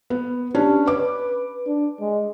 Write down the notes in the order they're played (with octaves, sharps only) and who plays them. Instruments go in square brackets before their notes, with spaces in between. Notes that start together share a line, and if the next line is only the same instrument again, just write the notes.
[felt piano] B3
[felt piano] C#4 D4 [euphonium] G4
[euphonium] B4 [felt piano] D6
[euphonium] D4
G#3